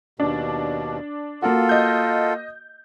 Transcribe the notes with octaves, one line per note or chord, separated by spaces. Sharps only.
D#2 B2 D4
A#3 F4 F#4 A4
D#5 G6